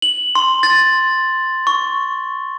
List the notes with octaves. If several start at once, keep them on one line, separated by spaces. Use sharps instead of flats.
F#7
C6
A6
C#6